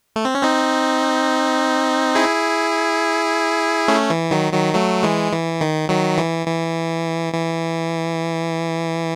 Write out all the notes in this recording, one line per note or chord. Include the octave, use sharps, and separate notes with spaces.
A3
C4
C#4
C4 D#4
E4 G#4
A3 C#4
E3
D#3 F#3
D#3 F#3
F#3 A3
E3 G#3
E3
D#3
D#3 F#3
E3
E3
E3